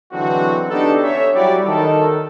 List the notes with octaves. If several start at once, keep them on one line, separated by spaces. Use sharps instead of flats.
D3 E3 F#3 G#3 C4 F#4
B3 D4 D#4 G4 A4
C#4 C#5 E5
F#3 G3 E4 F#4 G4 D5
D#3 A4